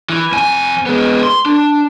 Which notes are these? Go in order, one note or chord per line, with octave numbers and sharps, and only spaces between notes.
E3
F2 G#5
G#3 B3
C6
D4